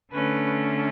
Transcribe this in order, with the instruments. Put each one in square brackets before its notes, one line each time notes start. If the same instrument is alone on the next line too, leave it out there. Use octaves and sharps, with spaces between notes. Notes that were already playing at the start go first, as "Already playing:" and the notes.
[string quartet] D3 A3 C#4 B4